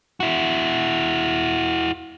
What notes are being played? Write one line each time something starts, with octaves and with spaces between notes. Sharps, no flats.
E4 F#4